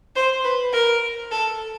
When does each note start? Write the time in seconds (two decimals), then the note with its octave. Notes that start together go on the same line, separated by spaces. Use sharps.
0.16 C5
0.44 B4
0.73 A#4
1.32 A4